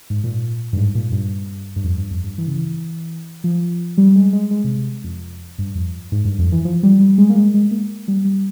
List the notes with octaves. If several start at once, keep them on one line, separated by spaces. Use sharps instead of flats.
G#2
A#2
G2
G#2
A#2
G2
G2
F2
G2
F2
G2
E3
C#3
E3
F3
G3
G#3
G#3
G#3
C3
C3
F2
G2
F2
G#2
G2
F2
E3
F3
G3
G3
G#3
A#3
G#3
G#3
A#3
G3
G3